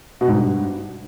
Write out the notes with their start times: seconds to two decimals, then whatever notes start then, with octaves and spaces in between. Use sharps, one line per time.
0.21 B2
0.28 G#2
0.35 G2